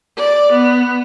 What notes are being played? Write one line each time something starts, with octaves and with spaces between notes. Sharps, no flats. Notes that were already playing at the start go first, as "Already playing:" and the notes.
D5
B3